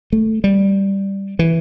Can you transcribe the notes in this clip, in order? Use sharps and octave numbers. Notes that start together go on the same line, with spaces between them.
A3
G3
E3